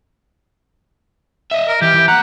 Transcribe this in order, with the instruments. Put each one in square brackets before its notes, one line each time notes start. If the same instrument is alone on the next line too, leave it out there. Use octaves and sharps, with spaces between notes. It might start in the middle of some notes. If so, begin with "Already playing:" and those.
[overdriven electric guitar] D#5 E5
[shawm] A#4
[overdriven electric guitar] E3 [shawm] G4
[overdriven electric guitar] E3
[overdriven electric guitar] A#3 A#5 [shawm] F#5